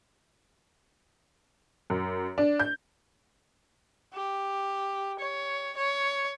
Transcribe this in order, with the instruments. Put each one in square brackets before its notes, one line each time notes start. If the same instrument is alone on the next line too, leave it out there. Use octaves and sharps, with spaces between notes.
[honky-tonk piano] F#2
D4
G6
[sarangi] G4
C#5
C#5